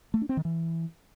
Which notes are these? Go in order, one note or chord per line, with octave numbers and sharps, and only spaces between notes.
A3
D4
C4
D#3
E3